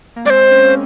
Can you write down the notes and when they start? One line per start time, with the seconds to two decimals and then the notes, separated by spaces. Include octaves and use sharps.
0.16 A#3
0.25 G#3 C4 D5
0.30 C5
0.51 A#3 C#4